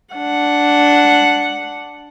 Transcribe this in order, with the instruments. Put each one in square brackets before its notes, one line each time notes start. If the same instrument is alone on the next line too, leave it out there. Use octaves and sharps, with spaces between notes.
[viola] D4 F#5